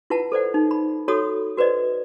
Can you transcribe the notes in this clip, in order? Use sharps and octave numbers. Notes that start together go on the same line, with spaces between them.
E4 F4 B4 F#5 A5
A4 C5 D5 F#5
D#4
B5
F#4 A4 C#5 B5 D#6
F#4 B4 C5 D5 D#5